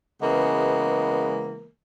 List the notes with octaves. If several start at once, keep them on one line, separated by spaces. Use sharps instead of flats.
C#3 E3 G#3 A#3 B3